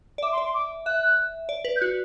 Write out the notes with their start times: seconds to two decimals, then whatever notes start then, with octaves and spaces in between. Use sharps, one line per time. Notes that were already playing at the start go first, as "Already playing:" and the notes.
0.18 D5
0.23 E5 D6
0.32 C6
0.38 D5
0.44 C6
0.54 D6
0.86 E5 F#6
1.49 D5
1.65 B4
1.76 G6
1.81 F#4 F#6